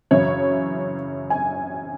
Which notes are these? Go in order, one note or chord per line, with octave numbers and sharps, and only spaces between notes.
F#2 C#3 E3 C#5
G#5